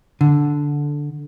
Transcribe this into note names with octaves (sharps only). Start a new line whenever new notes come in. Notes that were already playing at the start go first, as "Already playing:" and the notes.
D3